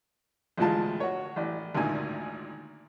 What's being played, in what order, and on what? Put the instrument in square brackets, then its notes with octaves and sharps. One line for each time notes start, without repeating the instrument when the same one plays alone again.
[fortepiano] A1 D2 F3 G#3 F4 A5
F#4 C#5
A1 D5
G#1 D2 A#2 G#5